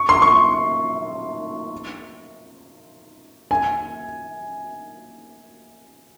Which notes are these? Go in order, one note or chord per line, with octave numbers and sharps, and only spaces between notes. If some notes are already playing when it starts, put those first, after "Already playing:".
Already playing: C#6
C6
C#6
G#5